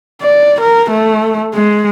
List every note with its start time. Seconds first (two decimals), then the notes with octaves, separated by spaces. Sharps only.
0.22 D5
0.61 A#4
0.91 A3
1.54 G#3